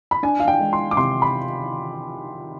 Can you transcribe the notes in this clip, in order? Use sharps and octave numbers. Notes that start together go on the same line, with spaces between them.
B5
D4 G#5
F5
G5
G#3
C6
D6
C3 C6
B5